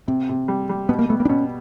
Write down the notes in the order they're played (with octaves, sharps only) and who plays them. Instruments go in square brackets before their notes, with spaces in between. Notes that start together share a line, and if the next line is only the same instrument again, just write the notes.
[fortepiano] C3 [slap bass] C4
[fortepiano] C3
G3
G3
[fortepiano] B2 [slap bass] B3
[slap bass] A#3
[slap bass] A3 [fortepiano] B3
[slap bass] A#3
D4
[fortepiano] B2 [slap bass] C#4